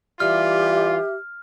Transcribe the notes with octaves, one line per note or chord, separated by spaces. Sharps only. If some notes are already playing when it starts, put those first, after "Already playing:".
E3 G3 F4 G4 E5 F6